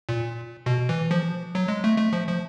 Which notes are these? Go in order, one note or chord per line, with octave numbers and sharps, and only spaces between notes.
A#2
B2
E3
F3
F#3
G#3
A3
A3
F3
F3